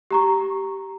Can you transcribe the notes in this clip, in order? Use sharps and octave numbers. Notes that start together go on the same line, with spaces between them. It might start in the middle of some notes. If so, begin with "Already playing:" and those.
G4 A#5 C#6